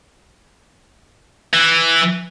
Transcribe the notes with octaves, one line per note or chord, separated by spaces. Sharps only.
E3